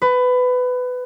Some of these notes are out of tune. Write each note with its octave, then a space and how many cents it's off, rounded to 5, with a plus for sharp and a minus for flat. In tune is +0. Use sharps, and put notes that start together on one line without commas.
B4 +20